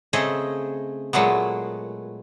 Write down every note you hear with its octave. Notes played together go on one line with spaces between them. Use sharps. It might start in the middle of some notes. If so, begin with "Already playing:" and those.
C#3 A3 C4 G#4 D#5
A#2 F#3 G#3 A3 B3